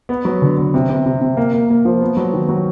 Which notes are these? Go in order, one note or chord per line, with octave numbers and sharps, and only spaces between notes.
B3
F#3
D3
B3
C3
C3
C3
C3
A#3
A#3
A#3
F3
B3
F#3
D#3
F#3